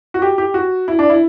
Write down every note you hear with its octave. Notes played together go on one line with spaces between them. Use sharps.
F#4
G4
G4
F#4
E4
D4
E4